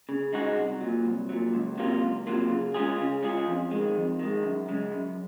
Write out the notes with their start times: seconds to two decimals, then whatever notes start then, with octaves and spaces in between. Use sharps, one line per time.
0.09 C#3
0.33 G#3 D#4 F#4
0.57 C2
0.81 A#2 F#3
1.05 C2
1.29 A#2 F#3
1.54 C#2
1.78 C3 F#3 A#3 F4
2.01 C#2
2.27 C3 F#3 A#3 F4
2.50 C#3
2.74 G#3 C#4 F4 G#4
2.98 C#3
3.23 G#3 C#4 F4 G#4
3.46 F2
3.71 D#3 G#3
3.95 F2
4.19 D#3 G#3
4.43 F#2
4.68 C#3 G#3
4.91 F#2